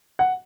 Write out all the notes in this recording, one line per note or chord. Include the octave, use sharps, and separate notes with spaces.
F#5